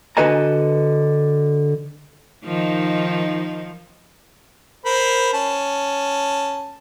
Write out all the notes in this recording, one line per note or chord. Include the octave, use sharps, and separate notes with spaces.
D3 F#4 B4 D#5 G#5 A#5
D#3 F3 D#4
A#4 C5 B5
C#4 A5